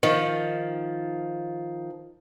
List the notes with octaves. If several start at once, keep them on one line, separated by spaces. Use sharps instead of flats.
D#3 F3